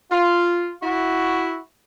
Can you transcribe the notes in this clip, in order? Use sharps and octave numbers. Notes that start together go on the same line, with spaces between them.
F4
E4 F#4